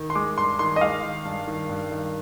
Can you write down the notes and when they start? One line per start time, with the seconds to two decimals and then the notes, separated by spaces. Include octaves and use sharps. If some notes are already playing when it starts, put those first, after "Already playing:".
Already playing: D#3
0.10 C6
0.15 G#3 D6
0.37 G2 C6
0.59 D#3 C6
0.76 D#5
0.81 G#3 F5
1.03 D#3
1.25 G2
1.48 D#3
1.69 G2
1.91 D#3